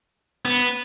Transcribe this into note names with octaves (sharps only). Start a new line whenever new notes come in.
B3